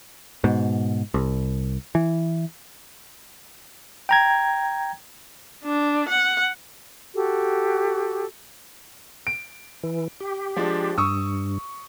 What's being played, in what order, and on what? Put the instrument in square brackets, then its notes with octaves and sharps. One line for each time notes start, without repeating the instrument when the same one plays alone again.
[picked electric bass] G#2 B2
C2
E3
[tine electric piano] G5 A#5 G#6
[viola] D4
F#5
[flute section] F#4 G4 A4
[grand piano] D7
[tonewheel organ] E3
G4
[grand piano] F3 G#3 D4
[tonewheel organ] G2 [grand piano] C#6 D#6 E6